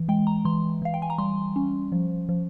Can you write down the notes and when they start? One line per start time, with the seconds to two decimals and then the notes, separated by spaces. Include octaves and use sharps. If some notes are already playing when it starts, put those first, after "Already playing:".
Already playing: E3
0.09 G#3 G5
0.27 A#5
0.45 E3 C6
0.82 E3 F5
0.94 G5
1.02 G#5
1.10 A#5
1.18 G3 C6
1.56 C#4
1.92 F3
2.29 F3